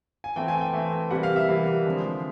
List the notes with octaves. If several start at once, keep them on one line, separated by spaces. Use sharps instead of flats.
G#5
E3 A3 C4 G5
G#5
G5
E3 A3 C4
C3 E3 G3 A#3 F#5
F5
E5
C3 E3 G3 A#3
D3 F3 G#3 C4